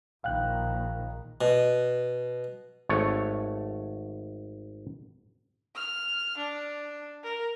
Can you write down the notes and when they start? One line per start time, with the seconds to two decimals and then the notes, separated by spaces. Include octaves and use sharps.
0.24 A#1 D#3 F5 G5 F#6
1.41 B2
2.89 G#1 A3 C#5
5.75 F6
6.37 D4
7.24 A#4